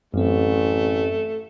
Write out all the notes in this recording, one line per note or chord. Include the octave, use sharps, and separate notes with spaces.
A1 F#2 A3 C4